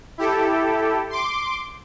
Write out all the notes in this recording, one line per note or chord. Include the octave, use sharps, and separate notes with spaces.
E4 G4 A4
C6 D6